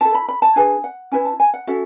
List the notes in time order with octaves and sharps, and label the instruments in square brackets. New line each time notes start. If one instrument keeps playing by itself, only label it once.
[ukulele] E4 A4 A5
B5
B5
A5
D4 G#4 B4 G#5
F#5
C#4 E4 B4 G#5
A5
G#5
F#5
C#4 F#4 A4 E5